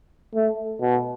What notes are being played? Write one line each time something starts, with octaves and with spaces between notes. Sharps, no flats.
A3
B2